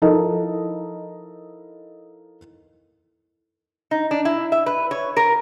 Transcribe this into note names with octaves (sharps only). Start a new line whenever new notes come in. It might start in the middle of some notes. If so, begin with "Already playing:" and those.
F3 D#4 E4 A4 A#4 D#5
D#4
D4
E4
E5
B4
C#5
A#4